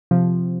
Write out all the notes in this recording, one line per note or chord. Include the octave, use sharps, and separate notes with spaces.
C3 F3